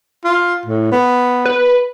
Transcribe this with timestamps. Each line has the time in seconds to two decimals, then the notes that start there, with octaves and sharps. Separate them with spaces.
0.24 F4
0.66 A2
0.92 B3
1.45 B4